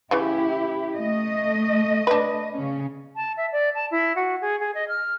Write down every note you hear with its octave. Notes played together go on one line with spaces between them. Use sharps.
C#3 E3 E4 G4
A3 D#5
D4 B4
C#3 C#4
A5
E5
D5
A5
E4
F#4
G#4
G#4
D#5
F6